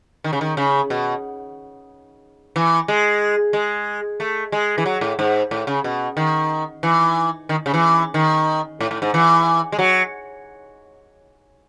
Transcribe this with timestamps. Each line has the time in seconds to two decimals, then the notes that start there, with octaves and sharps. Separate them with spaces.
0.24 D#3
0.33 C#3
0.41 D#3
0.57 C#3
0.90 B2
2.56 E3
2.88 G#3
3.53 G#3
4.20 A3
4.52 G#3
4.78 E3
4.86 F#3
5.01 A2
5.19 G#2
5.51 A2
5.67 C#3
5.84 B2
6.17 D#3
6.83 E3
7.49 D#3
7.66 C#3
7.74 E3
8.14 D#3
8.81 A2
8.91 A2
9.02 G#2
9.14 E3
9.72 G#3
9.79 F#3